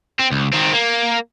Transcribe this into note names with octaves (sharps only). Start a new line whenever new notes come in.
C4
C#2
D#3 C4
A#3